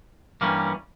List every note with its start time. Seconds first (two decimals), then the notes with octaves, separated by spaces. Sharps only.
0.41 G2 E3 G3 A#3 C#4